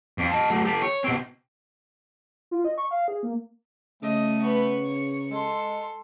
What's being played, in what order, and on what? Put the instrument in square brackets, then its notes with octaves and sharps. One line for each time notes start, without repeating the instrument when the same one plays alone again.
[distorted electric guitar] F2
D#5 A5
F#3 A3
G4 A4
C#5
B2 C4
[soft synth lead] F4
D#5
C#6
F5
G#4
A#3
[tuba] C#3 [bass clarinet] A3 [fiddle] D#5
[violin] B3 B4 [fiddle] C#6
[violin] C#7
[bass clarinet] G#3 [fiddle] A4 C6